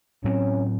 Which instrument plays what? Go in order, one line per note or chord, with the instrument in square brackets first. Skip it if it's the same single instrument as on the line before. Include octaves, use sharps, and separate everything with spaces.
[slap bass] A2 F#3 C4 [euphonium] C#4